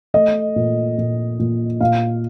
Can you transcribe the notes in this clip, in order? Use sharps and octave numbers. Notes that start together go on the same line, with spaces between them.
A3 D#5
A#2
A#2
A#2
A#2 F5